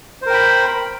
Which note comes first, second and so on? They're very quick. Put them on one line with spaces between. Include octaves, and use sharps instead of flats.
C5 A#4 G5 B5